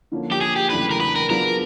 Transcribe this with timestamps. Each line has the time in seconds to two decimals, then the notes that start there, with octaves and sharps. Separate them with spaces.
0.12 D3 F3 A#3 C#4
0.32 G4
0.41 G#4
0.56 G4
0.70 E2 C#3 F#3 A3 D4 B4
0.91 A#4
1.00 B4
1.16 A#4
1.30 F#3 B3 D4 F4 G#4 A#4